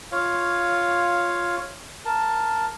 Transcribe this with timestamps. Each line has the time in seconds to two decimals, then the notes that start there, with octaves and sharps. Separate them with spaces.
0.12 F4 C#5 F5
2.05 A#4 A5